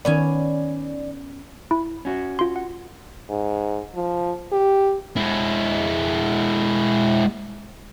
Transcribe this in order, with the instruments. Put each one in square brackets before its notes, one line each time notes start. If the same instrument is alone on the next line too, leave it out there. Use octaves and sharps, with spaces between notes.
[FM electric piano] D#3 D5 [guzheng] B3 C#4 G#5
[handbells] E4
[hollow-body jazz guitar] C#4 F#4
[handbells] F4 C6
F#5
[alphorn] G#2
F3
G4
[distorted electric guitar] G#3 E4